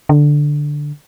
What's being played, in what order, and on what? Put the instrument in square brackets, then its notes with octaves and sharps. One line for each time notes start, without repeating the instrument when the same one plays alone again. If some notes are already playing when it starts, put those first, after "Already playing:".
[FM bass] D3